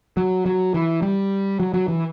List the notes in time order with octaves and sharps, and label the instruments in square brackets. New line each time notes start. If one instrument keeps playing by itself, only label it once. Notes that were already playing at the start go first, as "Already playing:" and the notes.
[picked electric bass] F#3
F#3
E3
G3
F#3
F#3
E3